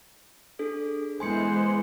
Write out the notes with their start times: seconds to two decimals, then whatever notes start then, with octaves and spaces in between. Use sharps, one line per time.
0.59 D4 G#4 A4
1.20 E3 G#3 B3 C5 G#5 C6 C#7